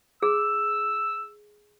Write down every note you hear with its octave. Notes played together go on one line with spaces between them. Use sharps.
G#4 E6